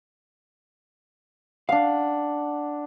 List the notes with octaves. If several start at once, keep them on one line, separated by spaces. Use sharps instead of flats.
D4 F5 F#5